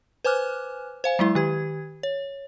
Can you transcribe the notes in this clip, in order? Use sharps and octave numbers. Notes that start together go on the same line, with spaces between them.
B4 C5 G#5 D6 F6 F#6
C5 F5 G#5
F#3 G#3 E4
D#3 G4 G#6
C#5